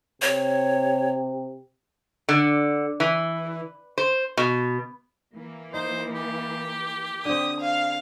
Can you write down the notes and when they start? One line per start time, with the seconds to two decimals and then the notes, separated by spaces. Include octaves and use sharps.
0.22 C3 C#5
2.29 D3
3.00 E3
3.98 C5
4.37 B2
5.35 E3 A#3
5.74 D#4 C5
6.15 G4
7.25 D3 C4 D#6
7.60 F5